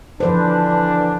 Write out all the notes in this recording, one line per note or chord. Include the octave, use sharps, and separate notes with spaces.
D3 E3 F3 D4 B4 C5